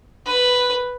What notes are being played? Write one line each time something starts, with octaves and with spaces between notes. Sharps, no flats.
B4